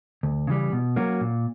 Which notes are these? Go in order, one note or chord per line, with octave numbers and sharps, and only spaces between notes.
D2
C#3 E3 G3
B2
F#3 A#3 C#4 F#4
A#2